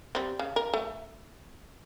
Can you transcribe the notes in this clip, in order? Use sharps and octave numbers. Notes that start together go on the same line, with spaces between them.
G3 C4
C#3
A#4
A3